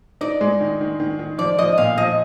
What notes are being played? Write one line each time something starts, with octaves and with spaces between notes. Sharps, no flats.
D#4 D5
G#3
D#3
D#3
D#3
D#3
F3 D5
F3 D#5
A#2 F5
F3 D#5